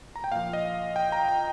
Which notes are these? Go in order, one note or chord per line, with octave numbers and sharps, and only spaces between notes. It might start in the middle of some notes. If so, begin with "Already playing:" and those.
A#5
G5
A#2 F3 F5
D#5
G5
A#5
G5